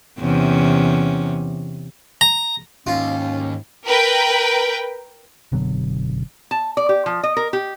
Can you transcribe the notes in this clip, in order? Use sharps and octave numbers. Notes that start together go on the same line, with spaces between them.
E2 C3 C#4
A#5
D#2 G#2 C#4 F4
A#4 B4 G5
F#1 B2 D3 F#3
A5
D5
G4
F3
D#5
A#4
G4